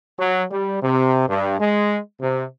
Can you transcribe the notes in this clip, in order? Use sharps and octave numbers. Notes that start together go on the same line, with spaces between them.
F#3
G3
C3
G2
G#3
C3